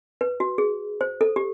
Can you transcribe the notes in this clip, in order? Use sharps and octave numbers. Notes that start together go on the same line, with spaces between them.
B4
F#4
G#4
C5
A4
G4